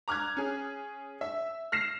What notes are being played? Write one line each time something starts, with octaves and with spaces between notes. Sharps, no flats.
A#5 D6 F6 F#6 G#6
C#4 G#4
E5
F6 A#6 C7 E7